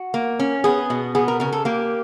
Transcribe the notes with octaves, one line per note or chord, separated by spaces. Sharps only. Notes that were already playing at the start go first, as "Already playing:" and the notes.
Already playing: F#4
A#3
C#4
B3 G#4
B2
B3 G#4
A#4
C#3 A#4
A4
A#3 G4